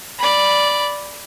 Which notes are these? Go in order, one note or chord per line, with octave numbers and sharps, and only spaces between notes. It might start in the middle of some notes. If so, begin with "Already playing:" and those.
D5 B5